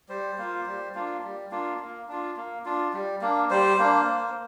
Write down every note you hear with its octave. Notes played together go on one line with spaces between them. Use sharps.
G3 C5
A#3 F4
G3
A#3 D4 F4
G3
A#3 D4 F4
A#3
D4 F4
A#3
D4 F4
G3
A#3 D4
G3 C5
A#3 D4
A#3